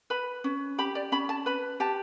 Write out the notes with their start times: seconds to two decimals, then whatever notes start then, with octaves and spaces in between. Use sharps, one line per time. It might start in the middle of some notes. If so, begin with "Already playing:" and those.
0.10 B4 B5
0.44 C#4
0.78 G4 B5
0.95 D5
1.12 C#4 B5
1.29 A5
1.46 B4 B5
1.80 G4 A5